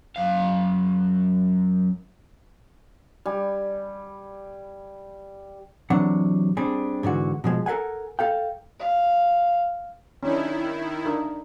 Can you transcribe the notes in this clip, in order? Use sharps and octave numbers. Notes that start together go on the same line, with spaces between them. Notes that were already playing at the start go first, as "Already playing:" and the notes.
F#2 F5
G3 G#5
C3 E3 F#3 D4 F#5
G3 C4 D4 G#4
G#2 D3 E3 F#4
B2 F3 G#3
A4 A#4 F5 F#5 G#5
A4 F5 G5
F5
D#3 C#4 D4 E4
D4 D#4 A#4